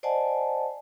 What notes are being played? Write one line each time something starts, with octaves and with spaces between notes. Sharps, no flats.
C5 D5 D#5 F#5 G#5 A5